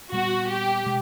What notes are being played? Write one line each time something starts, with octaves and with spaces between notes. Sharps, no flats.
A#2 G3 B3 F#4
G4
B2 G#3